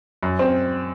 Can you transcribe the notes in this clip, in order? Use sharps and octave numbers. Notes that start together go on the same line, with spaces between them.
F#2
C4